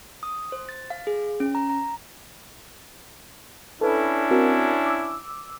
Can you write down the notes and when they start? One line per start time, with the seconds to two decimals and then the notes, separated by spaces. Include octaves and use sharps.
0.23 D#6
0.52 C5
0.69 A6
0.90 F5
1.07 G#4
1.40 C#4
1.55 A#5
1.70 A#5
3.81 C#4 D4 E4 A4 B4
4.31 C4 F#4 A#4
4.86 D6 E6